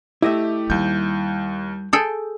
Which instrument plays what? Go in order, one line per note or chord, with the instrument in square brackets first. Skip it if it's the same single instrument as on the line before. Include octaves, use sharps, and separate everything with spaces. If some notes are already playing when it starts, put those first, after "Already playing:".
[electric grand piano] A3 G4 [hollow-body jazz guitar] E4 D#5 E5
[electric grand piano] D#2 G6 [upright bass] G3
[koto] G#4 A4 G5